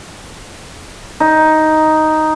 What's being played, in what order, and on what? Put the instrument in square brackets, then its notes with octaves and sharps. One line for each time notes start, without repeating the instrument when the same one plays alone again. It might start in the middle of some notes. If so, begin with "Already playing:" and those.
[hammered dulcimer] D#4